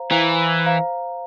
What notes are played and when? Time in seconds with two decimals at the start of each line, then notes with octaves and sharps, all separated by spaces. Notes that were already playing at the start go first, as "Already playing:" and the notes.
Already playing: C5 F5 A#5
0.11 E3 C5 F5 A#5
0.66 C5 F5 A#5